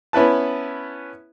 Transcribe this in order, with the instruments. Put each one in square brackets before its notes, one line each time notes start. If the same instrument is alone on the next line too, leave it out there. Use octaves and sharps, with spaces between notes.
[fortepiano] B3 C#4 E4 B4 A5